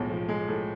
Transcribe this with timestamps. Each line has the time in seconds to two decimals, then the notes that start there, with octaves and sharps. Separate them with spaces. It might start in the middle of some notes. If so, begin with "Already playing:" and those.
Already playing: B1 A2 F3 G#3
0.10 F3
0.29 G#3
0.48 A2